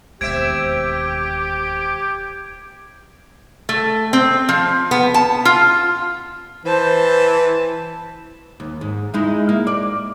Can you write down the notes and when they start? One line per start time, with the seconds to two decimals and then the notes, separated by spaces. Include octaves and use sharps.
0.21 E1 D#2 C4 G4 E5 G#6 D7
3.69 A3
4.13 C4
4.49 F3
4.91 B3
5.14 A5
5.45 F4
6.65 E3 C5 A5
8.60 D#2
8.81 G#2
9.14 G#3 D#4 E4
9.49 A#3
9.67 D5